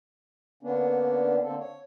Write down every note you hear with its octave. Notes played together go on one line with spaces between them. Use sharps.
D3 A#3 B3 C#4 D4
D3 A#3 C4 A4
C#5